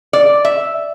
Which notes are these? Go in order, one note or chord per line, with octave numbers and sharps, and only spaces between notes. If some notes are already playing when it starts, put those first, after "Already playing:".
D5
E5